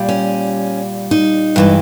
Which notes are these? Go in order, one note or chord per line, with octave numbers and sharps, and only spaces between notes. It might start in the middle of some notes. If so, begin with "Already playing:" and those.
Already playing: A#2 G3
C#4
D#4
G2 E3 G#3